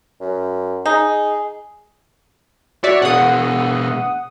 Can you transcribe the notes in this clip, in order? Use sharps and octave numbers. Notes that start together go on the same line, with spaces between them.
F#2
D#4 G#4
F#4 C#5 D5 E5
B2 G#4 F#5 D#6